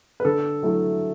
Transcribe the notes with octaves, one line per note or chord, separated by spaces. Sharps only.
B4
D3 A4
F#3 A3 E4